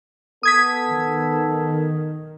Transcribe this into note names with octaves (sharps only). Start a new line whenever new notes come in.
B3 A4 D#6 G#6 B6
D#3